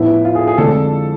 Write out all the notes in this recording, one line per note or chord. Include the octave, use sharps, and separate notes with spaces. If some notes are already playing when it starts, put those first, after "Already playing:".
Already playing: A2 F3 B3 E4
F4
G#4
G#4
F2 D3 F3 G#3 D4 A4